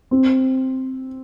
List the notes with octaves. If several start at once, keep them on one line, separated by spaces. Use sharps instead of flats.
C4